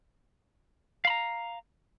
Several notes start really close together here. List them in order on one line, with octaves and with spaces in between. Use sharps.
F5 B5 A#5